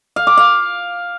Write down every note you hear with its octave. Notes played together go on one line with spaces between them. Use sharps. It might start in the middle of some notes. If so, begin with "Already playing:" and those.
F5
D6
F5